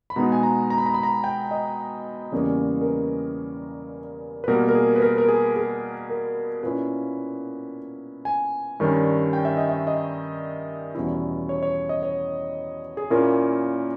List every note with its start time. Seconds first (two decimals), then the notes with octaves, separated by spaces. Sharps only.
0.10 B5
0.16 B2 G#3 B3 D#4 A#5
0.32 G#5
0.43 A#5
0.70 A#5
0.78 B5
0.86 A#5
0.94 B5
1.03 A#5
1.24 G5
1.51 D#5
2.32 E2 C#3 G3 A#3 C#4
2.81 A#4
2.86 B4
4.44 B4
4.48 B2 G3 A#3 A#4
4.69 A#4
4.75 G#4
4.95 B4
5.02 A#4
5.18 A#4
5.28 G#4
5.56 G#4
6.10 A#4
6.63 A#2 A#3 C#4 E4 B4
8.25 G#5
8.80 G2 D#3 G3 C#4
9.33 G5
9.45 E5
9.57 D#5
9.69 E5
9.87 D#5
10.95 E2 B2 G3 C#4 E4
11.49 C#5
11.63 C#5
11.89 D#5
12.03 C#5
12.97 G#4
13.10 A#2 A#3 C#4 E4 A#4